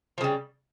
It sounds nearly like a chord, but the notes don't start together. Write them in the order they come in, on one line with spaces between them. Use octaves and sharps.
F3 C#3 G3